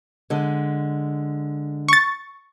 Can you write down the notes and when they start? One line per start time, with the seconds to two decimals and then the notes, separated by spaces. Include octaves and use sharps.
0.30 D3 G#3
1.89 C#6 A6